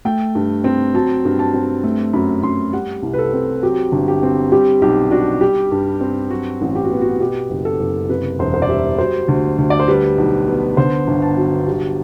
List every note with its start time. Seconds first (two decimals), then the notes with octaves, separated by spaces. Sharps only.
0.05 A3 G5
0.35 G2
0.64 C4
0.94 F#3 A5
1.25 G2
1.39 A5
1.54 C4
1.84 A3
2.13 F#2 B5
2.43 F#2 C6
2.73 G3 F#5
3.03 C2
3.13 B4
3.19 A4
3.33 C4
3.63 F#3 G4
3.92 G1
4.08 G4
4.23 C4
4.52 G3 G4
4.82 B1 G4
5.11 D4 F#4
5.41 G3 G4
5.72 G2
6.01 C4
6.31 F#3 F#4
6.61 A1
6.75 G4
6.84 F#4
6.91 B3
7.01 F#4
7.20 B2 G4
7.50 F#1
7.65 A4
7.79 F#1
8.09 C3 B4
8.39 E1 C5
8.54 C5
8.62 D5
8.69 G3 E5
8.98 F#3 C5
9.28 D2
9.58 D2
9.70 D5
9.80 C5
9.88 G3 B4
10.18 B1
10.48 B3
10.77 D3 C5
11.07 G1
11.22 A5
11.37 F#3
11.67 G3